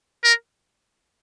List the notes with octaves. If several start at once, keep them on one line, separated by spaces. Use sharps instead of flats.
A#4